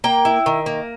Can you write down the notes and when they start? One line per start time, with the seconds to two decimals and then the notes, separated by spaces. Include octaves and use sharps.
0.04 A#3 G5
0.25 E4
0.46 D#3
0.66 A#3